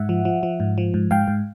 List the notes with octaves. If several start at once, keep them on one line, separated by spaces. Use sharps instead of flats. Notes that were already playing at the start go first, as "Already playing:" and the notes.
Already playing: G#2 E5 F#5
F3
F3
F3
G#2
F3
G#2
G#2 F5 G5
G#2